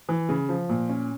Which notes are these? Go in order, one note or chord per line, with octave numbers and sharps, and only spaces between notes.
E3
C#3
F3
A#2
C#4